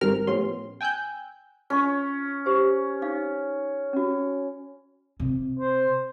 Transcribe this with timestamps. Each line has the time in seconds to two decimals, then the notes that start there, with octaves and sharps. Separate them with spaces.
0.01 G#1 G#2 G3 C4 A#4 F6
0.27 A2 F3 B3 C#4 G4 C6
0.81 G5 G#5 E6 F#6 G6
1.70 C#4 F4 C#6
2.46 G4 C5
3.02 D#4 D5 F5
3.93 C#4 F#4
5.20 C3
5.59 C5